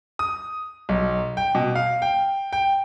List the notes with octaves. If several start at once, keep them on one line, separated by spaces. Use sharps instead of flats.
D#6
B1
G5
B2
F5
G5
G5